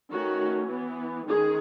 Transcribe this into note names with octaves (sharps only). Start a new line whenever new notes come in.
D#3 A3 C#4 F#4
E3 B3
D#3 G#3 C#4 G#4